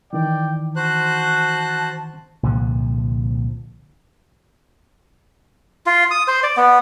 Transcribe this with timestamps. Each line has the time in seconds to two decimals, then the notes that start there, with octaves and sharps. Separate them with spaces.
0.13 D#3 E3 D5 G5
0.76 F#4 C5 A5 F#6
2.43 C2 A#2 D3 F3
5.86 F4
6.11 D#6
6.28 C5
6.43 D5
6.57 B3